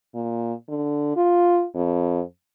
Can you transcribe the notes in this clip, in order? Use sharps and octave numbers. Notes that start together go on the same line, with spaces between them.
A#2
D3
F4
F2